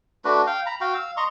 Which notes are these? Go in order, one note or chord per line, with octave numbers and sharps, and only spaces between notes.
A3 D4 F#4 B4
F5 G5
A#5 B5
F#4 F5 G5
F5 E6
D#5 A#5 C6 C#6